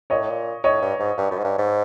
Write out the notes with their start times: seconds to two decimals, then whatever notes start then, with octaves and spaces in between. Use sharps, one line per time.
0.10 A#2 C#5 D#5
0.20 A2
0.29 A#2
0.64 A2 C#5 D#5
0.81 G2
0.99 G#2
1.17 G2
1.31 F#2
1.39 G#2
1.44 G2
1.58 G#2